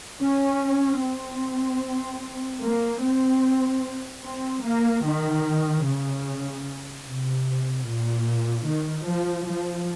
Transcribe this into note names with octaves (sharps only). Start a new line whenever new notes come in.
C#4
C4
A#3
C4
C4
A#3
D#3
C#3
C3
A#2
D#3
F3
F3